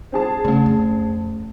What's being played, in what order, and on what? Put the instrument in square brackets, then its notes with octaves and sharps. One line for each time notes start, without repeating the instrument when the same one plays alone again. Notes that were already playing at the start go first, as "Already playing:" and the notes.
[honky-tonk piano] C4 G#4 A5
[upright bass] C#3 [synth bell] A3 C#4
[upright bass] F2